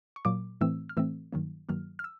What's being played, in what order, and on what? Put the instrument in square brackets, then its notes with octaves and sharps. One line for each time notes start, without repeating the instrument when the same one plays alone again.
[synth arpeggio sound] C#6
A#2 F#3 A#3 D6
A2 E3 A3 C4 E6
F6
A2 E3 A3 C4 E6
G2 D#3 F#3 A#3
G2 D#3 F#3 A#3 F6
F6
E6